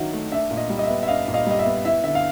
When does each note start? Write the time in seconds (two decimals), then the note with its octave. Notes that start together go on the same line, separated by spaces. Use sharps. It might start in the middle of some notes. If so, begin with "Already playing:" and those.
Already playing: D#3 F#3 D4 E5 F#5
0.13 A3
0.32 D4 E5
0.51 A#2
0.57 D#5
0.70 G3
0.79 D#5
0.83 E5
0.90 B3
1.03 E5
1.08 D4 D#5 F5
1.28 A#2
1.34 D#5 F5
1.47 G3 D#5
1.59 E5
1.66 B3
1.85 E4 E5
2.04 D3 E5
2.15 F5